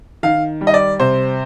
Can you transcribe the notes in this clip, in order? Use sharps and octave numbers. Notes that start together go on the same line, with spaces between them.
D#3 F5
G3
D#5
D5
C3 C5